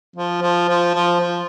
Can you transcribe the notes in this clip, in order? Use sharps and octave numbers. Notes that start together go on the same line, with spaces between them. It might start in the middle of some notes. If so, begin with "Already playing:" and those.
F3
F3
F3
F3
F3